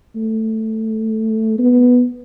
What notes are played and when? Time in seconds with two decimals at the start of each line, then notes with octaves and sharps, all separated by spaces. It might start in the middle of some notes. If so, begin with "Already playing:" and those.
0.16 A3
1.59 B3